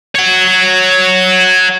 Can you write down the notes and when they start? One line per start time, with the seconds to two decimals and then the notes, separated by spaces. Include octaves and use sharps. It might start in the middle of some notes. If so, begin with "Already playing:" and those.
0.15 C#5 F#5